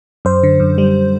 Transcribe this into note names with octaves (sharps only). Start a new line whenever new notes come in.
F#2 C5
D3
F#2
G3